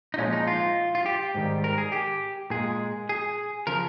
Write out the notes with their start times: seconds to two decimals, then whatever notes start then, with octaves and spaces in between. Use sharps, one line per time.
0.14 D#4
0.18 A#2 F3 G#3 C#4
0.33 D#4
0.47 F4
0.95 F4
1.06 G4
1.35 G#2 D#3 G3
1.64 A#4
1.78 G#4
1.92 G4
2.50 A#2 G#3 G#4
3.09 G#4
3.67 C#3 F3 A#4